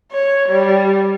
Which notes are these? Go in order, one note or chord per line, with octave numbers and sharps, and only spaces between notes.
C#5
G3